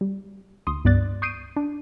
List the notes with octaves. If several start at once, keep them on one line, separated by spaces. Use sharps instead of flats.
G3
D2 C6 D#6
C#2 G2 B3 D5 F#6 A6
C#6 D#6 G6 C7 D7 D#7
D4